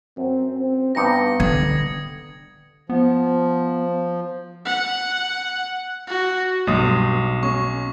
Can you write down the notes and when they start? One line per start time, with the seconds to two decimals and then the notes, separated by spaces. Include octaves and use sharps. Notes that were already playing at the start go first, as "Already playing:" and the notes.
0.17 F#2 C4
0.54 C4
0.95 G2 B3 D#4 G4 A#6 C#7
1.40 D3 D#6 G#6
2.89 F3 B3
4.65 F#5
6.08 F#4
6.67 B1 G2 D#6
7.43 C#4 C#6